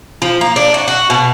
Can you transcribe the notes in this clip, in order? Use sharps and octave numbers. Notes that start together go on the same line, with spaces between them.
F3
A#3
D4
F#4
F#4
B2